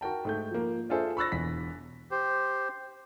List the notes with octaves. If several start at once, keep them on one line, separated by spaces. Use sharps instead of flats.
F#4 A#4 G5 A5
G#2 A3 G6
F3 A#3
D4 F4 G#4 A4 C5 E5
B5 C#6 E6 F#6 A6 A#6
E1 E2 B6
G4 C5